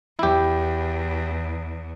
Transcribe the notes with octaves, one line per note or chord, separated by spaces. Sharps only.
E2 E4 G4